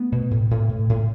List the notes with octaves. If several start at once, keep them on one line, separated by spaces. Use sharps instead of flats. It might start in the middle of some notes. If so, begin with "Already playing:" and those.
Already playing: A3 B3
B2
A2
A2
A2
A2